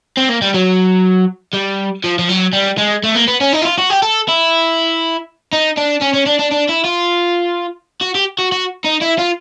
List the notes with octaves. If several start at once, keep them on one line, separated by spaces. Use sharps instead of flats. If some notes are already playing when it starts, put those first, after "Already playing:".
C4
A#3
G3
F#3
G3
F3
F3
F#3
G3
G#3
A3
A#3
B3
C#4
D#4
E4
F4
F#4
G4
A4
E4
D#4
D4
C#4
C#4
D4
D4
D4
E4
F4
F#4
G4
F#4
F#4
D#4
E4
F4